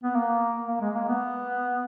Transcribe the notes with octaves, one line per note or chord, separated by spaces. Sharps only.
B3
A#3
A#3
G#3
A#3
B3